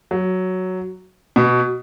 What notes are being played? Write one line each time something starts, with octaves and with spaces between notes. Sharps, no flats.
F#3
B2